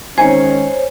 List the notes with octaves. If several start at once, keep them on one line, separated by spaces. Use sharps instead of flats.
D#3 G#3 C#4 D#4 C5 C#5 G#5